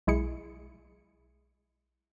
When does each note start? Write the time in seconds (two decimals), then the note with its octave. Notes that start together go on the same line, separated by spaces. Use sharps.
0.07 B1 G#3 E4 G#4 C#7